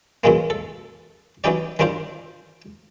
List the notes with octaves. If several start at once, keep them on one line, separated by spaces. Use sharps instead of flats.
F#2 A#2 E3 G#3 A#3
A4
E3 F#3 C#4 D#4 G4 D5
D#3 G3 C4 D4 F4 C5